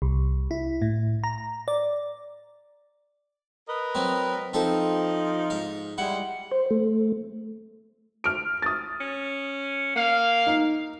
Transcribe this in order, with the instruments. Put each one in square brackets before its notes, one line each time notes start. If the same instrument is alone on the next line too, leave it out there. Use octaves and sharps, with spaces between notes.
[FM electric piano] C2
E4
A2
A#5
D5
[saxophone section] A#4 B4 D#5
[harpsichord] F#3 C4
[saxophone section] F3 D#4 [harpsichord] C4 A4
[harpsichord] G#2 F5
[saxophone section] G3 G#3 F#5 [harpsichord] E4
[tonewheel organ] C5
A3
[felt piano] F6 D7
D#6 A6
[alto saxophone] C#4
[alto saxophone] A#3 [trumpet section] F5
[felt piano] D#4